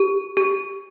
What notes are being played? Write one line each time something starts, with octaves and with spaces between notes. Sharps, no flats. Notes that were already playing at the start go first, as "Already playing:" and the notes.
Already playing: G4
G4